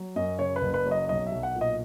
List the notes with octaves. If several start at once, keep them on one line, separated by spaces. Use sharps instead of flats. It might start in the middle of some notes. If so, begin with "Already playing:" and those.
Already playing: F#3
F#2 D#5
C#3 C#5
B4
F#1
B4
F#3
D#5
B1 D#5
E5
B1
F#5
A#2
D#5